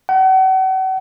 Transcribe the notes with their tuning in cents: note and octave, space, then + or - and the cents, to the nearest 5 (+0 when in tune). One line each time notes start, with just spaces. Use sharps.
F#5 +40